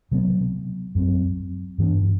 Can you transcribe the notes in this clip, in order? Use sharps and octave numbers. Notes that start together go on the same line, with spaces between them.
C3 F#3 B3
F#2 F#3 C4
G2 E3 B3 D4